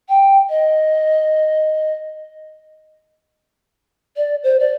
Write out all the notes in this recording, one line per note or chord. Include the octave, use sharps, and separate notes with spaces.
G5
D#5
D5
C5
D5